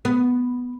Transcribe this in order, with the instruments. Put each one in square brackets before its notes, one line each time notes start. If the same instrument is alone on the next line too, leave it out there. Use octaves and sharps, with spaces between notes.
[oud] B3